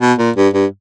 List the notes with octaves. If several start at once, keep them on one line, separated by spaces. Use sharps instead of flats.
B2
A#2
G2
G2